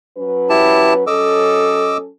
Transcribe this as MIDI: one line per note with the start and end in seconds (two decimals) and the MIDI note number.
0.18 1.07 54
0.18 1.07 61
0.18 1.07 71
0.50 0.93 64
0.50 0.93 67
0.50 0.93 81
1.07 2.10 54
1.07 2.10 61
1.07 2.10 69
1.07 1.97 75
1.07 1.97 86
1.07 1.97 88